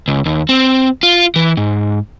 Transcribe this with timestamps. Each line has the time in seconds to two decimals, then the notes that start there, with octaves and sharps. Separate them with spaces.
0.08 C#2
0.26 D#2
0.49 C4
1.03 F4
1.36 E3
1.57 G#2